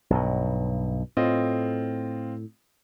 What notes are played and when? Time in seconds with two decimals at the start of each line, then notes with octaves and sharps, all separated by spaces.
0.10 B1 G2 B2
1.17 A2 C4 F4 D#5